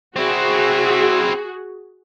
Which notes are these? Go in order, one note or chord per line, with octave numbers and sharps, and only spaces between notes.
C4 E4 F#4 G#4